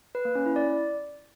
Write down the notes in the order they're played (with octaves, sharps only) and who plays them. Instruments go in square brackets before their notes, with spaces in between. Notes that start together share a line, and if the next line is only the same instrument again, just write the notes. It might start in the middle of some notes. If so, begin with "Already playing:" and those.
[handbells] B4
A#3
C#4
E4
D5